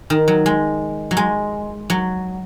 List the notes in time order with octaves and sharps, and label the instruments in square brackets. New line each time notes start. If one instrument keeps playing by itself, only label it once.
[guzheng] D#3
F#3
G#3
F#3
G#3
F#3